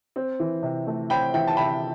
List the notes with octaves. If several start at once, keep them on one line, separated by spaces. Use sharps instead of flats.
C4
E3
C3
A3
C4 G5 B5
E3 E5 G5
A5
C3 G5 B5